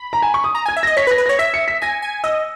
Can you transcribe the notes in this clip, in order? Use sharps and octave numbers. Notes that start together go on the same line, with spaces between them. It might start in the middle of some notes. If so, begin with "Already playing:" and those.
Already playing: B5
A#5
G#5
C#6
D#6
A#5
G#5 G#6
E5
D#5 A#6
C#5 B6
B4
A#6
B4
C#5 A#6
E5 B6
C#7
B6
G#5 A#6
G#5
D#5 E6